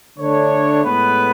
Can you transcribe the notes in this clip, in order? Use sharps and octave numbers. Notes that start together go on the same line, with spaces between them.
D3 A3 D4 C#5
A2 G#3 B3 B4